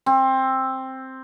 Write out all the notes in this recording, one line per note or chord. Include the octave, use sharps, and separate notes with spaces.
C4